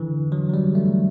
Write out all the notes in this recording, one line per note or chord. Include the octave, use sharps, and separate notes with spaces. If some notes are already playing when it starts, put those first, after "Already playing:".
Already playing: D3 E3
F#3
F#3
G3
A3